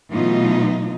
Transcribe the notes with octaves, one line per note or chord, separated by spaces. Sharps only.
B2 E3 F#3 A3 D#4 F4